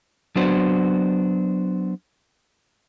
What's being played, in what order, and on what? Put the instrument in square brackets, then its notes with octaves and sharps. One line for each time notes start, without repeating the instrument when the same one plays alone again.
[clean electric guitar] F#3 B3 D4 F#4 C5